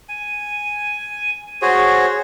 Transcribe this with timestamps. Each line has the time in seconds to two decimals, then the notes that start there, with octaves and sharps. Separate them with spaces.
0.09 G#5
1.62 F#4 G#4 C5 C#5